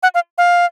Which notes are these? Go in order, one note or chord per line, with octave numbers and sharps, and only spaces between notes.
F#5
F5
F5